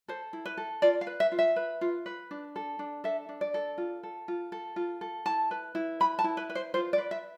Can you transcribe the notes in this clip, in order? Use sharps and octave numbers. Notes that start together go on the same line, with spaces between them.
A4 C5
E4
B4
A4
F4 D5
F5
B4
E5
F4
E5
B4
F4
B4
D4
A4
D4
A4 E5
D4
D5
A4
F4
A4
F4
A4
F4
A4
E4 A5
B4
E4
B4 B5
A5
E4
B4
B4
C5
F4 C5
D5
B4
E5